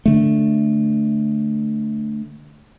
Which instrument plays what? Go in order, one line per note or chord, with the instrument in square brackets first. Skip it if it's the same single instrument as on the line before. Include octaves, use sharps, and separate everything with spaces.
[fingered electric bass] D3 A3